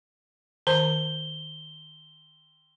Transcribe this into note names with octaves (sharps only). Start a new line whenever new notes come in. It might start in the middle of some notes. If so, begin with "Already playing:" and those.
D#3 C5 A#5 G7